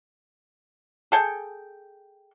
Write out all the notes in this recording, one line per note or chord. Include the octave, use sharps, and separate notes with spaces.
G#4 A4 G5